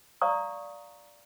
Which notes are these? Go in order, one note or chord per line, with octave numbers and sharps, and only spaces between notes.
D5 F5 A#5 C#6 D#6